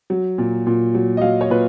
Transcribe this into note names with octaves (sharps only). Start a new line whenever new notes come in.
F#3
A#2
A#2
F#3
D#5
F#3 F5
C#5
A#2 B4